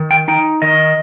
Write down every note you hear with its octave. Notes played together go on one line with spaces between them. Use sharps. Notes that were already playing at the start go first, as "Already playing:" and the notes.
Already playing: D#3
G5
D#4 G5
D#3 D#5